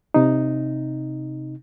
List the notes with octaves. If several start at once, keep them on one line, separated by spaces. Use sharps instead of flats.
C3 D#4